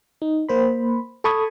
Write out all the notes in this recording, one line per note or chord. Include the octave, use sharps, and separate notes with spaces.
D#4
A#3 C5 B5
A4 A5 B5 C#6 D#6 G#6